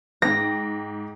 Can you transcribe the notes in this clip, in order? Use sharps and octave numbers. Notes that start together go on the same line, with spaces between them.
G#2 G5 A#6